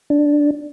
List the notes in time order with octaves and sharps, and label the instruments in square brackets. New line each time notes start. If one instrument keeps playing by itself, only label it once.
[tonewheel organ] D4